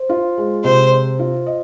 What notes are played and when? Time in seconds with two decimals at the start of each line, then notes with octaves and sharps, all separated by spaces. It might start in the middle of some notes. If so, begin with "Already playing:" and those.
Already playing: C5
0.09 F4
0.38 G#3
0.64 C3 C5
0.92 C5
1.19 F4
1.46 D#5